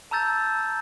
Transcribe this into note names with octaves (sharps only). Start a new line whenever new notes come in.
A5 A#5 E6 G6 A6